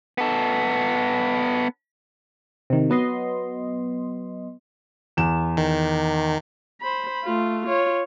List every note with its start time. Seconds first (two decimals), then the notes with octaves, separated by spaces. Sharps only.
0.18 B3 A4
2.70 C3 D#3
2.90 F#3 B3 D#5 C6
5.17 E2 E7
5.57 D#3
6.81 C5 B5
7.24 A3 F4
7.66 F4 C#5